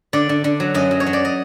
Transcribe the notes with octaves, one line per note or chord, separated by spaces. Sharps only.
D3 D5
D3
D3
F#3
F#2 D#5
F#3
C#5
F#3
D5
D#5